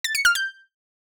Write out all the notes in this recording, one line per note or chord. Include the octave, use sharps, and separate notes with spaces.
A6
C#7
F6
G6